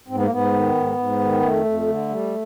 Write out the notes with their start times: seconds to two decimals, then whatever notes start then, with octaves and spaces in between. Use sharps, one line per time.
0.08 G#2 C4
0.16 B3
0.23 A#3
0.30 G#2 B3
0.52 D#3
0.74 G#2
0.97 G#2
1.20 D#3
1.42 F2 A3
1.65 F2
1.87 D3
2.09 G3